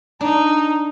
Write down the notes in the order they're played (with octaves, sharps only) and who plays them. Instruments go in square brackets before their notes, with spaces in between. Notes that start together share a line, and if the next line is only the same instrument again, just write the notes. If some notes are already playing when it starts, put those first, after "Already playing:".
[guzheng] D4 [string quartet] D#4 A#5